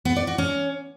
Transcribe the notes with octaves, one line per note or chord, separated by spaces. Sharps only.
B3
D5
F#4
C#4